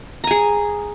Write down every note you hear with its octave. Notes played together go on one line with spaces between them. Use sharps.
G#4 G#5 A#5